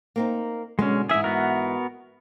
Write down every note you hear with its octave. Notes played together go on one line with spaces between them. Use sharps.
A#3 C4 D#4
B2 D3 G#3 B3 C#4
G#2 E3 G#4 E5
B3 F#4 A#4